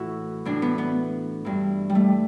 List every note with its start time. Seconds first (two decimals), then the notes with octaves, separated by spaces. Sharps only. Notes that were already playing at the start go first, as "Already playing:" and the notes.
Already playing: A2 E3 E4 F#4
0.45 A2 E3 D4
0.62 B3
0.78 B3
1.45 G2 E3
1.90 G3
1.95 A3